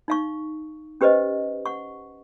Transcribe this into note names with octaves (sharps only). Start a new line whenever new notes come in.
D#4 F5 C#6
C#4 G4 B4 C5 D#5
F#5 C#6